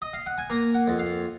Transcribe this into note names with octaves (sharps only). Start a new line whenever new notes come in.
D#5
F5
F#5
G#5
A#3 A#5
F#5
F2
F5